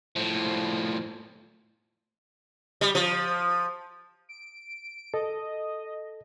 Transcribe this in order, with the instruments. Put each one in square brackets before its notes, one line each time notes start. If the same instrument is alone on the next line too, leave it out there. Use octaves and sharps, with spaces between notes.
[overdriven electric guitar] A2 F3
[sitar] G3
F3
[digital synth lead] D7
[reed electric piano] A4 [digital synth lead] D#5